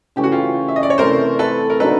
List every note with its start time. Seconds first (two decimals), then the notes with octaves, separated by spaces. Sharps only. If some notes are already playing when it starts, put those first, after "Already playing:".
0.16 C#3 E3 A3 C#4 G4
0.24 F#4
0.32 F4 G4
0.68 E5
0.76 D#5
0.83 D5
0.90 C#5
0.98 C3 E3 A3 C4 A#4 C5
1.39 A4 B4
1.70 A#4
1.80 D3 F#3 A#3 D#4 A4 B4